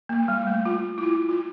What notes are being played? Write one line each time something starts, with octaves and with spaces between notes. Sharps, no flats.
A#3
G3
A3
F4
E4
F4
F4